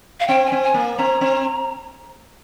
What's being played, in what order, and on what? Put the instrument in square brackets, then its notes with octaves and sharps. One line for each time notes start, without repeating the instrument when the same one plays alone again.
[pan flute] F5
[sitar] C4 [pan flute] G5
[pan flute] G#5
[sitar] C4
[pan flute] G#5
[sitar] A#3
[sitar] C4 [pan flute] A#5
[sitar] C4